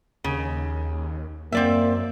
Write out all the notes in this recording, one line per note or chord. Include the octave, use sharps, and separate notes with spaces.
D#2 C#3
F#2 A#3 C4 D5 E5